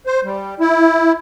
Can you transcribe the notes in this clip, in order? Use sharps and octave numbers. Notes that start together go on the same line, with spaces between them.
C5
G3
E4